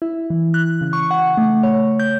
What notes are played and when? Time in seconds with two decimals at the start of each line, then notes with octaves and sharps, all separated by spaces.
0.02 E4
0.30 E3
0.54 F#6
0.81 C#3
0.93 C#6
1.11 F#5
1.37 A3
1.63 C#5
1.99 G6